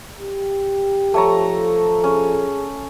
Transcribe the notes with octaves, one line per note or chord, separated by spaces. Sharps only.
G4
F3 A3 A4 C#5 A#5
C#4 G#4